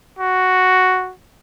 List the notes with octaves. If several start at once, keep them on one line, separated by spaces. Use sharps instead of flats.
F#4